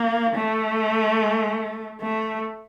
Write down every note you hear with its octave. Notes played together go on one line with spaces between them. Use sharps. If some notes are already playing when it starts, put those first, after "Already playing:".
Already playing: A#3
A3
A3